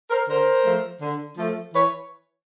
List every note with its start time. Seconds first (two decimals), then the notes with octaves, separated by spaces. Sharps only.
0.10 A#4 C5
0.29 D3 A#4 C5
0.65 F3 A3
1.02 D3
1.38 F3 A3
1.74 E3 B4 C#5